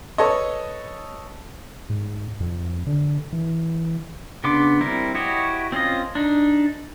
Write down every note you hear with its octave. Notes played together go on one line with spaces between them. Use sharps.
A4 B4 C#5 D#5
G#2
F2
D3
E3
C#3 B3 D4 C6 D6
G3 C4 E4 A#4
E4 F#4 G4 C#5 D#5
C4 C#4 F4 D#5
D4 D#4